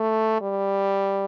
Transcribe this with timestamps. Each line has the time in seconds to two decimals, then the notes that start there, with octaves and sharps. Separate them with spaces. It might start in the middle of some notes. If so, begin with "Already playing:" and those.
Already playing: A3
0.42 G3